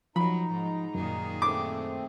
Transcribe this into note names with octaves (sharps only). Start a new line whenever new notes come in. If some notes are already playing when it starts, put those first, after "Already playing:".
F3 F#3 D#4 A#5 B5
G#2
F#2 A#2 D#3 G#4
A3 C4 D6